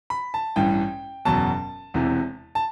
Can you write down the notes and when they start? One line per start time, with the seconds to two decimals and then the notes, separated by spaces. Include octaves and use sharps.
0.10 B5
0.34 A5
0.56 A1 G2 E3 G5
1.25 F#1 E2 B2 F#3 A5
1.94 E1 E2 C3 E3
2.55 A5